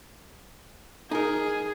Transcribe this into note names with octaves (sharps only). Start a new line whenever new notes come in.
D#4 G#4 A#4